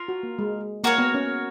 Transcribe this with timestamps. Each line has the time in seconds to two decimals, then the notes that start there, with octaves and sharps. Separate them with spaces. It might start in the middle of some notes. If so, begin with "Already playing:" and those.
Already playing: F4 A#4
0.08 F#4
0.23 A#3
0.39 G#3
0.84 A#3 F#4 A#4 C#5
0.98 B3
1.15 C#4